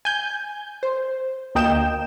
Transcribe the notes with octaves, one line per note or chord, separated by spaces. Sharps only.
G#5 G6
C5
D2 A#3 D#5 G5 G6 E7